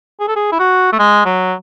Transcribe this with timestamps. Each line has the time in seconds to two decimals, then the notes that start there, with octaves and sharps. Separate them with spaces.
0.20 G#4
0.28 A4
0.36 G#4
0.52 E4
0.59 F#4
0.92 A3
0.99 G#3
1.25 F#3